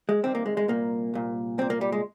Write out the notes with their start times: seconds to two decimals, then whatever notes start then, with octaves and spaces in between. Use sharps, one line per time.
0.09 G#3
0.23 C2 C3 D#3 C4
0.35 A#3
0.46 G#3
0.57 G#3
0.68 C2 A#2 A#3
1.14 C2 A#2
1.58 C2 C4
1.62 A#2
1.70 A#3
1.81 G3
1.92 G#3